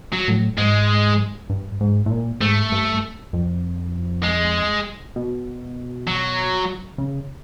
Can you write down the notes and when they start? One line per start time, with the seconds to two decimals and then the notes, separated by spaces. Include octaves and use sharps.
0.13 F#3
0.28 A2
0.58 G#2 G#3
1.50 G2
1.80 G#2
2.06 A2
2.10 A#2
2.41 G#2 A3
2.72 G2
3.33 F2
4.23 G#3
5.16 B2
6.07 F#3
6.98 C#3